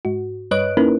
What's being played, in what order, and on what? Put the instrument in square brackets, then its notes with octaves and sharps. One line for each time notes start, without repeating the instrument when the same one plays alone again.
[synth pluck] G#2 F#4
G2 B4 C#5 D#5 F#6 D7
A#3 C#4 D#4 E4 A#4 B4